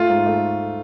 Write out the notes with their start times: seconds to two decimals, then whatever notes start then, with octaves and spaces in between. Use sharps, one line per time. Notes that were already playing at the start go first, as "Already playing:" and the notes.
Already playing: A3 F4
0.10 G#2
0.26 A3